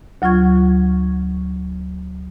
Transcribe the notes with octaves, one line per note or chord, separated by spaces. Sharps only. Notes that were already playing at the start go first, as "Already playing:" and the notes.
D2 F#3 F4 C#6 G#6